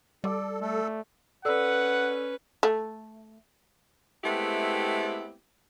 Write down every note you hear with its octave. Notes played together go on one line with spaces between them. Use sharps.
G3 A4 D5 D6
A3 A4
C#4 A4 B4 D5 F#5 E6
A3
G#3 A3 B3 C4 E4 G4